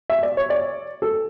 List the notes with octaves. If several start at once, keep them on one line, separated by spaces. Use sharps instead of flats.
E5
D5
C#5
D5
A4